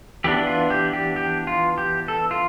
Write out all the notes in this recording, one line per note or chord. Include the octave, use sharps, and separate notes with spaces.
E3 B3 D4 G4
F4
G4
G4
G4
F4
G4
A4
F4